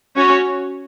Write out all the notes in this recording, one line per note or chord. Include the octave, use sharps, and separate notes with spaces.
C#4 F#4 C#5